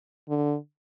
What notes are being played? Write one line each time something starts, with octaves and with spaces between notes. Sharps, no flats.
D3